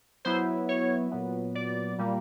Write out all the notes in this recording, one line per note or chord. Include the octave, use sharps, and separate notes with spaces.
F#3 B3 E4 C5
C#5
A#2 F#3 B3
D5
A#2 G3 A#3